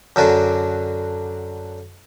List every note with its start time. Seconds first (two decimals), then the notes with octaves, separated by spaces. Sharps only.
0.16 F#2 D3 F#4 D5